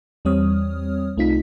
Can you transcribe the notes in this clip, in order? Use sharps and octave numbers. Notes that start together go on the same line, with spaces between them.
E2 G3 C4 C#5 D#6 F6
C2 A3 C4 D#4 F4 B6